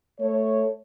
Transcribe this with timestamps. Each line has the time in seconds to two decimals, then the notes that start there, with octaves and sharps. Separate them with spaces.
0.20 A3 C#5